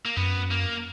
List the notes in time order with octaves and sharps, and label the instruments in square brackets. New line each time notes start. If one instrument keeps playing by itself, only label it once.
[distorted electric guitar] A#3
[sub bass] F#2 [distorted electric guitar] B3
[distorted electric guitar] A#3